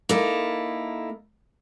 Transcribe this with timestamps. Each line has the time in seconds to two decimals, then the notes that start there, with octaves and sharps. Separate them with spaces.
0.09 A#3 D#4 E4 A4 A#4